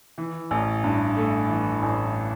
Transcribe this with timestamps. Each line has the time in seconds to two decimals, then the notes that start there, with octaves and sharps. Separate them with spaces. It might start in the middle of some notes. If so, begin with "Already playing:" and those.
0.18 E3
0.51 A1
0.84 G2
1.17 A3
1.49 E3
1.83 A1